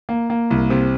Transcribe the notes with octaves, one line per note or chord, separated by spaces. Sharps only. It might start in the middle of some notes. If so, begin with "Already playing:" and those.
A#3
A#3
C2
C3